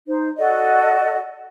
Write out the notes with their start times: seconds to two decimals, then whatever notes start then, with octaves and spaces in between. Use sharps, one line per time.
0.07 D#4 C5
0.38 F#4 A4 D5 D#5